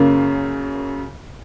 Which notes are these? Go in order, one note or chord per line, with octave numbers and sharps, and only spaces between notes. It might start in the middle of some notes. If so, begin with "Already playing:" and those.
Already playing: F#2 C#3 A#3